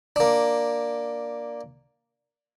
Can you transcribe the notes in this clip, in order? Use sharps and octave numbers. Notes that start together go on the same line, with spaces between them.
A#3 D4